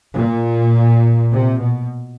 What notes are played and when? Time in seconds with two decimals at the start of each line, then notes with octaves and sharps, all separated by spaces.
0.16 A#2
1.32 C3
1.61 B2